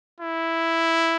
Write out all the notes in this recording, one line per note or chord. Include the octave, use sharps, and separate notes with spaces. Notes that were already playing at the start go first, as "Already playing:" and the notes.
E4